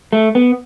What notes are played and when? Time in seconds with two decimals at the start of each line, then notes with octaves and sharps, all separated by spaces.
0.13 A3
0.35 B3